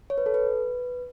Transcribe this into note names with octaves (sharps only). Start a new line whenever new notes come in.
C#5
B4
A4
B4